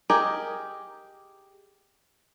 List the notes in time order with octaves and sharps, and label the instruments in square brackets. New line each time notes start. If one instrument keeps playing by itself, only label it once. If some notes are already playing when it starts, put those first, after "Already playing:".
[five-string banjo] G4 G#4 A#4 D#5